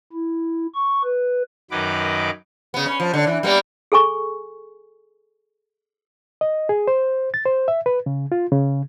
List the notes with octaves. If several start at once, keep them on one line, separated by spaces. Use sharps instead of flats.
E4
C#6
B4
F#2 D#3 F#3 D#4 B4 D6
C#3 B3
C#4
F3
D3
E3
G3 A#3 B3
G#4 A4 G#5 C#6
D#5
G#4
C5
A6
C5
E5
B4
C#3
F4
C#3